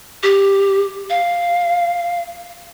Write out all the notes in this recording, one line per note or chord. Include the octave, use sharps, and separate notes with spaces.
G4
F5